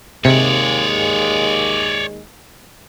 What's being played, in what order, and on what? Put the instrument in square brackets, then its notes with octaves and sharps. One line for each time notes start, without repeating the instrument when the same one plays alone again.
[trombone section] D#2 G#3 [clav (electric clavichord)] C3 [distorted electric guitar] C#5 D5